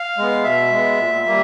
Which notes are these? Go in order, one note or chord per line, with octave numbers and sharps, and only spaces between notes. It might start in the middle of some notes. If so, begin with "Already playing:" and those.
Already playing: F5
G#3 B3
B2 E5
G#3 B3
A#2
G3 A#3